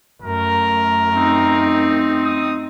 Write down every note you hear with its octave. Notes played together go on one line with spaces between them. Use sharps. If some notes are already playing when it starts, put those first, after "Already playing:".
F#2 A3 A#4
C4 D#4
D#6